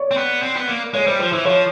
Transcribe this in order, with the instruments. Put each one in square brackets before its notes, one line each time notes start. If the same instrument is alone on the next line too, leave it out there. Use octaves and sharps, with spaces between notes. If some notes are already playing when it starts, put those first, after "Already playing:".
Already playing: [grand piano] C#5 D5
[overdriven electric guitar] C4
B3
C4
B3
A#3
[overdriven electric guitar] G#3 [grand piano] C#5
[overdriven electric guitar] G3 [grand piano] C5
[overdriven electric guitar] F3 [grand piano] C5
[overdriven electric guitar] E3 [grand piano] C5
[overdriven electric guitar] F3 [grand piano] C#5